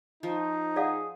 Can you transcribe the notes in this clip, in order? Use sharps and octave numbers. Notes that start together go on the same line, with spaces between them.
F3 D#4
G#4 D5 F5 F#5